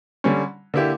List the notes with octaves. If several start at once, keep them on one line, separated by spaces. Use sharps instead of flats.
D3 G3 C#4
D3 A#3 E4 G4